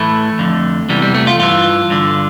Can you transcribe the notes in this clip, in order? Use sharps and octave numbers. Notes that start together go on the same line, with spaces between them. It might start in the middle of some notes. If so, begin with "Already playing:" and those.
Already playing: A2 E3 A3
F2 D3
E2 C3 E3 G3
G3
A3
F4
G2 E3 F4
G2 D3